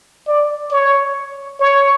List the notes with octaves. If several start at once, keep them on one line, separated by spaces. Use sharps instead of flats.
D5
C#5
C#5